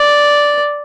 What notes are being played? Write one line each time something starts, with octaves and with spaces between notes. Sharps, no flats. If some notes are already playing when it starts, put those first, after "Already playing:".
Already playing: D5